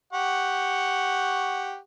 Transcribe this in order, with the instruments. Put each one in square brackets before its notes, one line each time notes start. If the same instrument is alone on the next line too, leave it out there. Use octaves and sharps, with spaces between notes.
[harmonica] G4 F#5 C#6